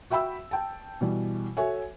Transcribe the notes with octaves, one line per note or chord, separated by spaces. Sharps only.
F#4 E5 G5 B5 E6
G5 A5
B2 E3 G3
F#4 A4 C#5 E5 G#5